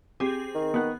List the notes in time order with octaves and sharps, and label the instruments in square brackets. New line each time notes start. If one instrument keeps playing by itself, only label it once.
[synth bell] C4 G#4 [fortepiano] G4
[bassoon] D#3
[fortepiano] B3 F#5 F#6